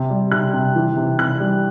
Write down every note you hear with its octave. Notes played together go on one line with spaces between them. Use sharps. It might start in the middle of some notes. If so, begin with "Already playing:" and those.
Already playing: C3
G3
C3 F#6
C3
E3
C3
C3 F#6
G3